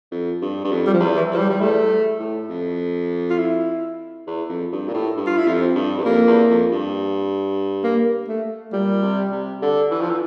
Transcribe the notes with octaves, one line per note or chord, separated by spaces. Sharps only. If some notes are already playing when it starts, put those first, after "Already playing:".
F2
G2
G2
F2
G3
F3
E2
E3
E2 F3
G3
G3
E2 A3
A2
F2
F4
E4
E2
F2
G2
A#2
A2
G2
F4
E4
F2 F4
C4
G2
E2
F2 A#3
E2
F2
G2
A#3
A3
A#2 G3
C3
C3
D3
E3
F3
E3